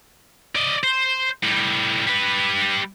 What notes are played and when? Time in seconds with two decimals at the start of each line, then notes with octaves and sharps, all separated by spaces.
0.55 D5 D#5
0.83 C5
1.43 A2 G3
2.07 G3 B4